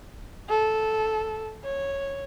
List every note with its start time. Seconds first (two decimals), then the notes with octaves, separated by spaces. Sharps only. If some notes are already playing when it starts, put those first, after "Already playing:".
0.49 A4
1.64 C#5